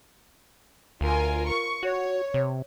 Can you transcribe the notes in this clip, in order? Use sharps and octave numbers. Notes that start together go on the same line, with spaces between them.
D2 F4 A#4 G#5
C#6
F#4 C#5
C3